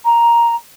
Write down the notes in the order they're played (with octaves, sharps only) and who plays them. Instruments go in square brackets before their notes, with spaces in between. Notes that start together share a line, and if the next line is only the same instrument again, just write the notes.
[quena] A#5